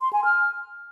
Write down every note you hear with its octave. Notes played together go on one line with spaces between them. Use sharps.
C6
G#5
F6